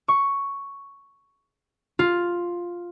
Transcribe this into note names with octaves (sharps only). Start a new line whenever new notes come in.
C#6
F4